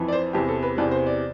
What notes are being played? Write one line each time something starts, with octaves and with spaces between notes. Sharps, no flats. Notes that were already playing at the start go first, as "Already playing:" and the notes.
Already playing: F2 E3
D5
C5
E2 C3 E3 G4
A4
B4
E2 C3 E3 D5
C5
D5